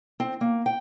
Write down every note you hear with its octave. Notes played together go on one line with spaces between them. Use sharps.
C4
A#3
G5